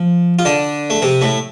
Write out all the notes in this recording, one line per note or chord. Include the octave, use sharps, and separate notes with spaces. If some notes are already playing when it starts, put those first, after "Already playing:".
Already playing: F3
F4
D3 D4
A3
C3 C4
A2 A3